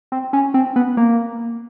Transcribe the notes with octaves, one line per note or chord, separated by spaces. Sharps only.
C4
C#4
C4
B3
A#3